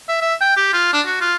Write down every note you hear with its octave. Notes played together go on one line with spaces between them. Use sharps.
E5
E5
G5
G4
F4
D4
F#4
F4